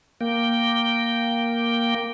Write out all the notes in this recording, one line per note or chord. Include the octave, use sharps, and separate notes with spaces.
A#3 G5